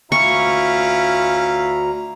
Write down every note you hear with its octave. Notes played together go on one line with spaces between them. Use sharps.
D2 C#4 E4 F4 A#5 C#6